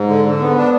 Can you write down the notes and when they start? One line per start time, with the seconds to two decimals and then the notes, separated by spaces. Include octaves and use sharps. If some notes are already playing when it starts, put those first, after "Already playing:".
Already playing: G#2
0.08 D3
0.25 D3
0.41 B3
0.57 D4